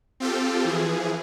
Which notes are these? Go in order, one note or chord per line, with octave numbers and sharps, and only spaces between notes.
C4 F4 G4 A4
E3 F3 G#4